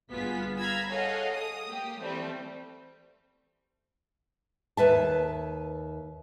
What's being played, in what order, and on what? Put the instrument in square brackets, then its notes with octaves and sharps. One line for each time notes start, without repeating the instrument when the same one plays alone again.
[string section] G1 B3 F4 G#4 B6
F5 A#5 B5 E6 G#6
G#4 A4 C#5 D#5 F5 F#5
D#6
A#3 G4
E3 G3 A3 C4
[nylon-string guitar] D#2 B4 E5 A5